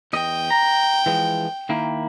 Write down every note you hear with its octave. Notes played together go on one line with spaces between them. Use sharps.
E2 D#5 G5
A#5
E3 F3 G#3
D#3 A#3 E4